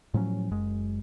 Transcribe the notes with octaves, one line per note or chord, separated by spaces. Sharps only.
A2 F3 F#3 C#4
F#1 F#2 G#3